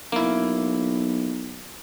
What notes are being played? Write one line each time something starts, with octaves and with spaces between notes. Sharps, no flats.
B1 A#3 E4